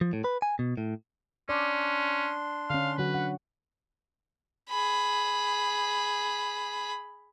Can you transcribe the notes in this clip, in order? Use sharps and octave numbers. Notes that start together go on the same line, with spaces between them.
F3
A2
B4
G#5
B2
A2
C#4 D4 D5 C6
D3 C#4 F5
D3 F#3 F#4 B4
F#5
G#4 B5